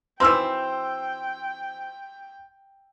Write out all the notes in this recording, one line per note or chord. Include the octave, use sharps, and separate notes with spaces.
E3 F#3 C4 G5 C6 E6